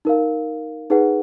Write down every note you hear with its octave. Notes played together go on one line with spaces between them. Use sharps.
D#4 A#4 F5
D#4 G#4 B4 F#5